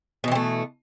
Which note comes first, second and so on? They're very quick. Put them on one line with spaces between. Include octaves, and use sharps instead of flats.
B2 E3 C4 A3